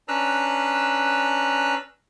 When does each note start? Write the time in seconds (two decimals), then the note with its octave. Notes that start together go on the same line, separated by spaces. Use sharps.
0.08 C#4 D4 B4 A#5 E6 F#6